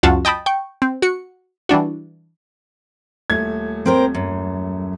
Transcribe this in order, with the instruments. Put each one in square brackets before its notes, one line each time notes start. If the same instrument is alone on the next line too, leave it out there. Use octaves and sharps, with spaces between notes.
[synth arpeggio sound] C#2 F#2 F#3 F4 F#4 A5
D#5 G5 A5 B5 D#6
G5 C#6
C4
F#4 C#7
E3 G3 D4 F#4
[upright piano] D#1 A3 G#6
[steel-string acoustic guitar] C4 A#4 C5
F#2